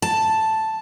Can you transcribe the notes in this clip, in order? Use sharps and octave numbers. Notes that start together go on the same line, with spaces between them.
A5